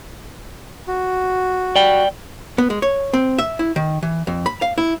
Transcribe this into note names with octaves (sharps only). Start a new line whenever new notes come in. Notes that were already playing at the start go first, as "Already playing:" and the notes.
F#4
D5 G5
B3
G#3
C#5
C4
E5
E4
D#3
E3
F2
B5
F5
E4